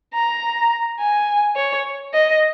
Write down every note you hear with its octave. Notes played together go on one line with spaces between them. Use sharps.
A#5
G#5
C#5
D#5